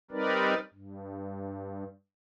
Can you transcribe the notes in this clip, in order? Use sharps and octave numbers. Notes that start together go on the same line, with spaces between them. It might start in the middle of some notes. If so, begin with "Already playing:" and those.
G3 C4 D#4 A#4 B4 D5
G2